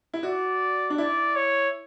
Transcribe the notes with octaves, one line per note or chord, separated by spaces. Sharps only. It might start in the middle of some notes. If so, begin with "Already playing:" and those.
E4
F#4 D5
D4
E4 D5
C#5